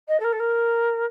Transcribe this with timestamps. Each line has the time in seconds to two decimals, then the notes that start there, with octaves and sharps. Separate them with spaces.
0.08 D#5
0.20 A4
0.24 A#4
0.32 A4
0.39 A#4